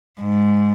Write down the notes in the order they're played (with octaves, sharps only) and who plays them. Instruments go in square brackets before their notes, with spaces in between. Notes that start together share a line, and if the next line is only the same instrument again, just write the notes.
[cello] G#2